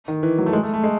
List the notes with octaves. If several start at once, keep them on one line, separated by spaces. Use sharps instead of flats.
D#3
E3
F#3
A3
G#3
A3
A3
G#3